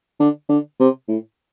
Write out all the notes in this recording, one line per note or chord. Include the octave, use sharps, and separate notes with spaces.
D3
D3
C3
A2